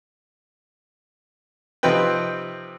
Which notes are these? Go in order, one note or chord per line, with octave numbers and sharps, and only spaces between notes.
C3 F3 C4 D#4 B4 G5